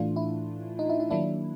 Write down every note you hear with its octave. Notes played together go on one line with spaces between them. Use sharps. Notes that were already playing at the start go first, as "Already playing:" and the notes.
Already playing: A2 E3 A3 D4 F4
E4
D#4
E4
E4
D#3 F#3 A#3 D4 E4